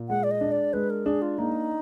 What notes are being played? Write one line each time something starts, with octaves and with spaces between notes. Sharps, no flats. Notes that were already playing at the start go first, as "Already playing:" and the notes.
Already playing: A#2
G#3 F#5
D5
D#5
D4
D5
G#3 B4
A#4
D4 G#4
F4
A#3 D#4